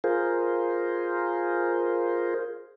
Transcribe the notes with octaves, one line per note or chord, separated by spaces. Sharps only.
F4 G#4 A#4 C5